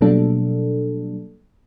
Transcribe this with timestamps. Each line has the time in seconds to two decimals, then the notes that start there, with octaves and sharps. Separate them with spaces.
0.01 B2 F#3 G3 A#3 D4 A4